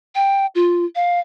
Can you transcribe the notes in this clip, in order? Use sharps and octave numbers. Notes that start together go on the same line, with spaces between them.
G5
F4
F5